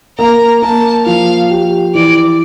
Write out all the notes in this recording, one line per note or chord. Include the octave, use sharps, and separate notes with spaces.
A#3 A#5
A#3 A5
F3 F5
G4
E3 D5